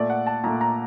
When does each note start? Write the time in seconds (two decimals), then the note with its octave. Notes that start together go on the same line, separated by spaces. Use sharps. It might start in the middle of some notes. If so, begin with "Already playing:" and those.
Already playing: A#2 A3 D5
0.10 F#5
0.26 A5
0.44 A#2 A3 A#5
0.61 A#5